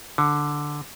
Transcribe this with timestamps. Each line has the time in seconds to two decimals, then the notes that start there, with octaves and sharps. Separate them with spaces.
0.18 D3